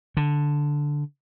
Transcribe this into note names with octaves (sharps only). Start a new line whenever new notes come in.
D3